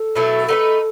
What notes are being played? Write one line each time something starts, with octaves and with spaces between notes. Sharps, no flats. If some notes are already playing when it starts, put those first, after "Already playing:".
Already playing: A4
B2 F#3 A3 E4
A3 D#4 F#4 A4 B4